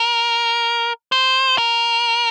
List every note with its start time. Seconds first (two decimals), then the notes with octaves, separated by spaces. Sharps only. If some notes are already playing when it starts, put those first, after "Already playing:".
Already playing: A#4
1.12 C5
1.58 A#4